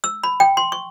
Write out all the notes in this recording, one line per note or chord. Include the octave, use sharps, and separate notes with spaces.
E6
B5
G5
C6
C#6